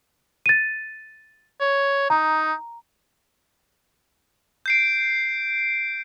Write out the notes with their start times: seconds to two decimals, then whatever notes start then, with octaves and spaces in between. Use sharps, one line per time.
0.46 A6 D#7
1.61 C#5
2.10 D#4 A#5
4.66 G6 C7 D7